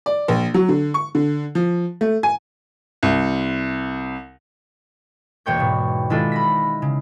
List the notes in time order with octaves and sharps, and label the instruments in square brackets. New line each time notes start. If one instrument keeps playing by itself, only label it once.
[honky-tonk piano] D5
A#1
F#3
D3
C#6
D3
F3
A3
G#5
[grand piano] C2
[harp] E1 A#3 C#5 G5 C#6 G6
G#2 B2
D#3 G#3 D4 E4 F4 A4
B5 A#6 B6
C#3